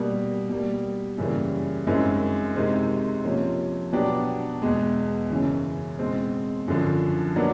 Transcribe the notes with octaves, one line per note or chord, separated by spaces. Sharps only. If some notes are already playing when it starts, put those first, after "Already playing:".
Already playing: B2 G3 A#3
B2 G3 A#3
F#2 C#3 E3 G3 A#3
F#2 D#3 G#3 C4 E4
C3 D#3 G#3 C4 D#4
C3 F3 A#3 C#4
B2 F#3 B3 D4 G4
E2 B2 G#3
F#2 C#3 E3
B2 G#3 C4
F#2 D3 F3
D#3 F#3 B3 D4